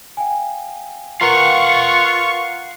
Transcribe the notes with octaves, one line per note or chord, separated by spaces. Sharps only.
F5 G5 G#5
F4 A#4 B4 F5 F#5 A#5 C#6